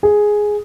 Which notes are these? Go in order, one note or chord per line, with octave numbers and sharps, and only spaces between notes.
G#4